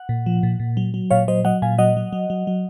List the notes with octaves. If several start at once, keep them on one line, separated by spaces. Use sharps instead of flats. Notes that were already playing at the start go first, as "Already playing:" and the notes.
Already playing: F#5
A#2
F3
A#2
A#2
F#3
F#3
A#2 C#5 F5
F#3 C5 D#5
F#3 D#5 F#5
A#2 F5 G#5
F#3 D#5 F#5
F#3
F#3
F#3
F#3